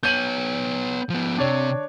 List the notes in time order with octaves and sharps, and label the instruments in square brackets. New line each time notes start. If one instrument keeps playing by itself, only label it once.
[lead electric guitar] B3 C#5 [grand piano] G6 D#7 F#7
[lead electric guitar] F3 B3
[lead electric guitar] C3 C4 [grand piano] D4 C#5